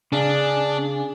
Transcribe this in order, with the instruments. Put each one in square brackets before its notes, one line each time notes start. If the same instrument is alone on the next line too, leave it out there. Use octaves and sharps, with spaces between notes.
[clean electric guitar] C#3 [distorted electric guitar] D4 [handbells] G#4 D5 G#5